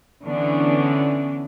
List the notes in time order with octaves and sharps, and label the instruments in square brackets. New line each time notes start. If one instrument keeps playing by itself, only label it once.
[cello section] D3 E3 B3 C#4 D4